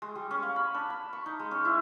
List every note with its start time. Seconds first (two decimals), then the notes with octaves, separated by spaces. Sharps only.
0.02 G#3
0.15 G3
0.31 C#4
0.43 F5
0.56 B5
0.74 D4
0.90 B5
1.13 C#6
1.26 D#4
1.40 G#3
1.51 C#4
1.65 E4